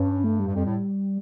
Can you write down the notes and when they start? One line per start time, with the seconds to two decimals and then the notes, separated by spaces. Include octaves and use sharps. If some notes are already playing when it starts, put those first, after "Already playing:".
Already playing: G2 C#4
0.24 A3
0.40 G3
0.47 G2
0.54 F2
0.64 A2